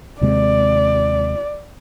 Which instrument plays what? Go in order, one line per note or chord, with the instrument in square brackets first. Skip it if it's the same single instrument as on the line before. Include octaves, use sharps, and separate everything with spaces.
[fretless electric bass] D#2 C3 G#3 [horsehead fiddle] D5